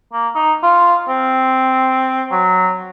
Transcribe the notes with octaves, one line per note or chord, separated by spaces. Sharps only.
A#3
D#4
F4
C4
F#3